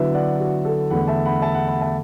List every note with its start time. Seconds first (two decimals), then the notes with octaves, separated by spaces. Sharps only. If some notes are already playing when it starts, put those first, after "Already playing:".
Already playing: D3 F#3 B3 E4 B4 E5
0.14 D5 F#5
0.40 F#4
0.65 A4
0.90 E2 D3 A3 F#5 B5
1.08 E5 A5
1.25 F#5 B5
1.42 E5 A5
1.55 F#5 B5
1.67 F#5 B5
1.81 E5 A5